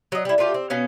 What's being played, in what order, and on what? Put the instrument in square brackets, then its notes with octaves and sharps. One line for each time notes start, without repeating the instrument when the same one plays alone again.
[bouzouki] F#3 D#5
G3 E4
A3 D4 F4 G4
C4
B2 B3 C#4 F5